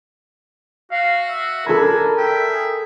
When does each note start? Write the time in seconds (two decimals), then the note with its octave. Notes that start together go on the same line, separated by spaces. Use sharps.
0.91 F#4 F5
1.28 E5
1.66 D4 A4 A#4 G#5 B5
2.17 E5 G5
2.49 G#4